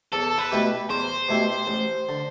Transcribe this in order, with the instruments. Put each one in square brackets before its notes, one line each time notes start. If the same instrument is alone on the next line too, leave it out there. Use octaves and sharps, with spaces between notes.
[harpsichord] E2 [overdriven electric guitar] A4
[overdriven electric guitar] B4
[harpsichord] B2 A3 E4 G4
[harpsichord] E2 [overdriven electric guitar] C5
[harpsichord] B2 A3 E4 G4
A1
D3